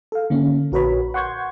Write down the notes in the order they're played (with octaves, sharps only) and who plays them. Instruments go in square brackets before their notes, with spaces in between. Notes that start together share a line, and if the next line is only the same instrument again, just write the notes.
[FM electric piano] A4 F5
D3 A#3 C#4
A#1 F#4 A#4 B4 C#5 B5
F#5 C6 C#6 G6 G#6